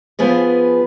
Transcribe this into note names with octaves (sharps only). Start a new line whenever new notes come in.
F3 B3 G#4 B4